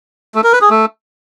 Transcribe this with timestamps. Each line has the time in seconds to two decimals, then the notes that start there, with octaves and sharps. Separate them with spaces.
0.35 A3
0.44 A#4
0.53 B4
0.61 G#4
0.70 A3